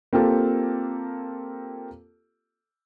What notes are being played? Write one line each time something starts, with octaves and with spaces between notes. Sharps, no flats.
A#3 C4 F4 G4 A4